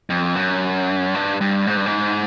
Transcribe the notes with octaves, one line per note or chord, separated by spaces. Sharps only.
F2
F#2
G2
G2
G#2
G2
G#2